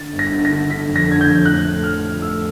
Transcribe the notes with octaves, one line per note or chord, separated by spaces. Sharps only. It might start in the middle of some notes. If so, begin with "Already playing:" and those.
Already playing: D3 A6
G1
A#6
D3
A#6
D3
D3 B6
F2
A#6
D3 G#6
G6
F2
A2 F#6
A3
F3 F6
F3
A3 E6